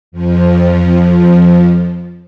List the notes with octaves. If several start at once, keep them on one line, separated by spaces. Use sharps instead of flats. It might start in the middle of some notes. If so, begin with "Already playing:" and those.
F2 F3